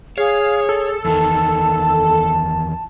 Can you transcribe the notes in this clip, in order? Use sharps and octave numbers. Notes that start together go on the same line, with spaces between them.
G#4 C#5 F5
A4
E2 D#3 A5